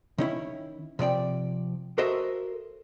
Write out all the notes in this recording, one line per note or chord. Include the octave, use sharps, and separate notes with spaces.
D#3 C#4 E4
C3 F3 D5 G5
F#4 A4 A#4 C5 D#5 E5